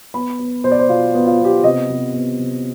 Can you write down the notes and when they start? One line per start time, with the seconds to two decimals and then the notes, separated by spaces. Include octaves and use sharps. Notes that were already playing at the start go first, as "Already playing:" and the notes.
0.14 B3 B5
0.39 B3
0.64 B2 C5
0.72 D5
0.79 C5
0.89 B2 F4
1.14 B3
1.26 F4
1.39 B3
1.45 G4
1.64 C3 D#5
1.89 C3
2.13 B3
2.39 C3